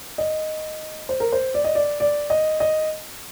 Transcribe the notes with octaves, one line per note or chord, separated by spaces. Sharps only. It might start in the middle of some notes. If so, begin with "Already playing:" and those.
D#5
C5
A#4
C5
D5
D#5
D5
D5
D#5
D#5